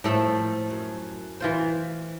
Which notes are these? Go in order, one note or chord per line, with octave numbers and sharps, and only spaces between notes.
A2 F3 A3 A#3 A4
F#2
E3 F4 C5